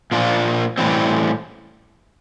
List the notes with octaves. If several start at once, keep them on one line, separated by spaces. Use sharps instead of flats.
A#2 F3 A#3 D4 F4
A2 E3 G3 C4